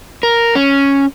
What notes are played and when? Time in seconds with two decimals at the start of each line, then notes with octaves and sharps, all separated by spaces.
0.23 A#4
0.55 C#4